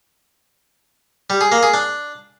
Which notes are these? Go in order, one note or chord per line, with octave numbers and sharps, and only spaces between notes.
G3
G#4
A#3
G#4
D4